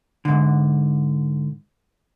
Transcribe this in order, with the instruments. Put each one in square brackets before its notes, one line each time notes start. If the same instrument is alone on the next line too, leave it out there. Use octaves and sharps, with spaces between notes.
[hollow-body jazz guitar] G#2 D3